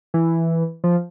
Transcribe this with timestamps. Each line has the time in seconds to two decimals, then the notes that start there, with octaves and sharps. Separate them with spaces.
0.14 E3
0.84 F3